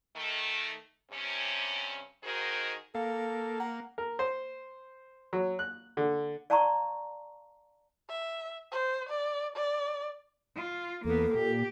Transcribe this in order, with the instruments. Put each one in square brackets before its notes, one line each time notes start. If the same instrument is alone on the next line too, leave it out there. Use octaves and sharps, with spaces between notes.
[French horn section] D#3 A3
G2 C3 C#4
D#3 D#4 F#4 G#4 A#4 C5
[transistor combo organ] A#3 [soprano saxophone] A4 [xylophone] F5
[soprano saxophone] F#5 [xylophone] A#5
[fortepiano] A#4
C5
F#3
F#6
D3
[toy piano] D5 F5 A5 A#5 C6 C#6
[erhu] E5
C5
D5
D5
[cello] F4
[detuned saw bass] E2 [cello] A#3 B3 [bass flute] A4
[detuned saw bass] A#2 [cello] G4